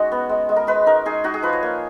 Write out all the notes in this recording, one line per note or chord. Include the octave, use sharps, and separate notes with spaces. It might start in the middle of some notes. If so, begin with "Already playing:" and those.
Already playing: G#3 C#4 D#4 F#4
B3
G#3
G#3
A#4
G#3 B4
D#4 A#4
D#4 G#4
D#4 F#4
G#4
F3 B4
C#5
A#3